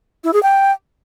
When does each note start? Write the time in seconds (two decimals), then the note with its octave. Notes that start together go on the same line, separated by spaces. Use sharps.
0.24 E4
0.33 G#4
0.43 G5